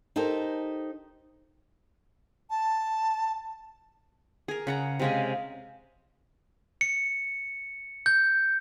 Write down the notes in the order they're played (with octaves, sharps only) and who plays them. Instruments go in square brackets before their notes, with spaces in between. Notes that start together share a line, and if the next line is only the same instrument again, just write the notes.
[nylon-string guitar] D#4 G4 A4 A#4 C5
[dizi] A5
[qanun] G#4 A#4
C#3 F#5 A#5
[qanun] C3 G#3 C#4 [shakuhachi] F5
[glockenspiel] C#7
G6